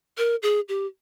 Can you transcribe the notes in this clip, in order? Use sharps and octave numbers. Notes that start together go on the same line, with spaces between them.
A#4
G#4
G4